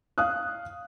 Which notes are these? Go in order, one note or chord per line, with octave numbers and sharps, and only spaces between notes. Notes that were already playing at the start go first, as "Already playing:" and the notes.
F5 D#6 F#6